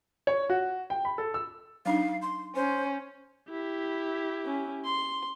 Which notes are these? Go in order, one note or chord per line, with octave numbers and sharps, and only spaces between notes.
C#5
F#4
G5
B5
A4
E6
F#3 D4 D#4 F5
C6
C#4 C5
E4 G4
C#4
C6